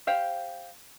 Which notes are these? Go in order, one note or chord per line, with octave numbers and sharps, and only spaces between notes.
G4 C5 F5 G5